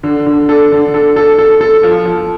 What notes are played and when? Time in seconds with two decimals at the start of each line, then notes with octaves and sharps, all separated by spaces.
0.03 D3
0.26 D3
0.49 A4
0.72 D3
0.94 A4
1.16 A4
1.39 A4
1.61 A4
1.83 F3
2.05 F3